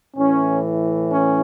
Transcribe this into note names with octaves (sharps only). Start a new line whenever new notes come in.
A2 E3 C#4
C#4